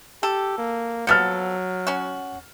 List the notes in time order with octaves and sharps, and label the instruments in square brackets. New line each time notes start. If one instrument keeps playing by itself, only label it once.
[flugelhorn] G4 [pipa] A4
[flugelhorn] A#3
[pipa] F3 B3 A4 [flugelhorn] F#3 [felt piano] F6 A6 C#7
[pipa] C#4 F#4